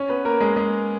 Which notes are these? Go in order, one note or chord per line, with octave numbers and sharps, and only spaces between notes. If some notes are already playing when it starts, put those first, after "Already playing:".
Already playing: C#4 C#5
B3 B4
A#3 A#4
G#3 G#4
G#3 G#4